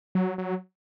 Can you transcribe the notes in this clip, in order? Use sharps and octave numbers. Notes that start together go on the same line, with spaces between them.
F#3
F#3